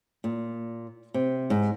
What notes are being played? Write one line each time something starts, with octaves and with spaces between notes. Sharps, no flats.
A#2
C3
G#2